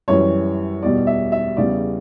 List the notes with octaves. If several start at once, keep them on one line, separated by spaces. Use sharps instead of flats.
F#2 E3 G3 C#5
E2 B2 G3 D5
E5
E5
E2 C#3 G3 D5